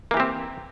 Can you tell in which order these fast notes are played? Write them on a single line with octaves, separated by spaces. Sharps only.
A#3 E3 G4 C4